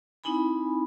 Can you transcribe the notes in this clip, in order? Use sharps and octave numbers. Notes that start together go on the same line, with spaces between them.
C4 D#4 E4 G#5 B5